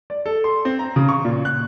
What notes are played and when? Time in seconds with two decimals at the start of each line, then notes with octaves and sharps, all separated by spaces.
0.10 D5
0.26 A4
0.44 C6
0.65 C4
0.79 A#5
0.96 C#3
1.09 C#6
1.25 A#2
1.45 F#6